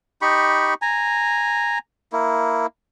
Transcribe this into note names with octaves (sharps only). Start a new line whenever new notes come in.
D#4 G4 B5 C#6
G#5 A#5
A#3 E4